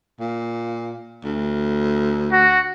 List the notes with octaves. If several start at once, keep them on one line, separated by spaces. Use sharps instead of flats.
A#2
D2
F#4